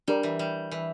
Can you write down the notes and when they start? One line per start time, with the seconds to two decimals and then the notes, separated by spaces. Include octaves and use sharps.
0.08 G3 D4 G4 A#4 D5
0.23 E3
0.39 G3
0.72 E3